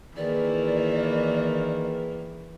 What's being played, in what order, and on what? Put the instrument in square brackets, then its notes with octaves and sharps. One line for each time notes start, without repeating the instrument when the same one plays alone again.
[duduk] D#3 [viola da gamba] E3 A#3 [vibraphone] E4 G#4 B4 [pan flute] D5